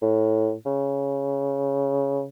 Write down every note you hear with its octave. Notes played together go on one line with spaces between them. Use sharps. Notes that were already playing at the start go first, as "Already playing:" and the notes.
A2
C#3